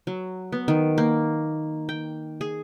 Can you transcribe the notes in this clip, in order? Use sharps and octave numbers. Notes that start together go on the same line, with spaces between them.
F#3
B3
D#3
A#3
G5
G#4